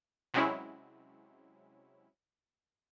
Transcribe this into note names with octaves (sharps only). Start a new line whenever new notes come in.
C3 F#3 G#3 C#4 E4